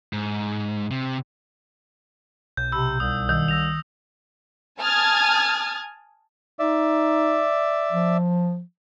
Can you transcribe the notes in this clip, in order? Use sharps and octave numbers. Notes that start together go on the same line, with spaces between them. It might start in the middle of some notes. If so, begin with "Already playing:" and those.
G#2
C3
B1 G6
C3 B5 E6
C2 D#6
D#3 D#6 E6
E6 A#6 F7
G#5 A5 D#6 F6 G#6 A6
D#4 D5 E5
F3